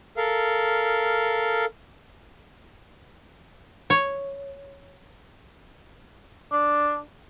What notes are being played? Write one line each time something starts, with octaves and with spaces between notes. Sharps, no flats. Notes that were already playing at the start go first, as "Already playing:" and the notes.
A4 A#4 F5
C#5
D4